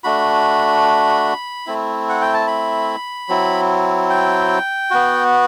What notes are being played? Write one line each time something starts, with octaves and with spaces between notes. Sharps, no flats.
A3 D4 F#4 B5
A3 C4 E4
F#5
G5
A5
B5
F#3 C4 E4
G5
B3 F#4